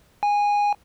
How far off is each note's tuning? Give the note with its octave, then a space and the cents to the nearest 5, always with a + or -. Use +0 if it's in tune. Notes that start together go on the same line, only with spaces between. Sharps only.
G#5 -15